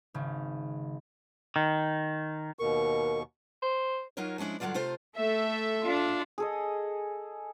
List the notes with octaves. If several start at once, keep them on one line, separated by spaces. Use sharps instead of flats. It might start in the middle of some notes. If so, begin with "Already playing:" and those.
G#1 C#3
D#3
D#2 B2 A#4 C#6
C5
F#3 D#4 F4 A#4 C#5
F3 G#3 C#4 D4 E4
G2 D3 F3 F#3 F4 D5
C3 A3 F4 A4 C5
A3 A4 E5
D4 F4
G#4 A4 D#5